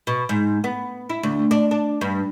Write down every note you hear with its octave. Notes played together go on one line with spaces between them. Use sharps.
B2
G#2
B3
E4
D2
D4
D4
G2